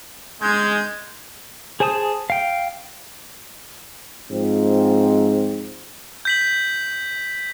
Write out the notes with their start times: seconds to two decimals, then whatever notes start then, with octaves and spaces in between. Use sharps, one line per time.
0.42 G#3 G6 G#6
1.80 G#4 C5 G#5 A5 D#6
2.30 F5 G5
4.30 G#2 F3 C4
6.25 G6 B6 F#7